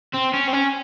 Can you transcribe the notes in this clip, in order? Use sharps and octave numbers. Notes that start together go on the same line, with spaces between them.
C4
C#4
C4
C#4